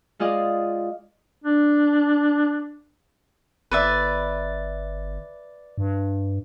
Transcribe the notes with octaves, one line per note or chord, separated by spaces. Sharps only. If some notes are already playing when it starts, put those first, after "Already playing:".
G#3 F4 G#4 D5 D#5 F5
D4
G1 B4 D5 E5
G2